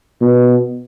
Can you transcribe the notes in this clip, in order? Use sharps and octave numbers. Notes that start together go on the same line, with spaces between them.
B2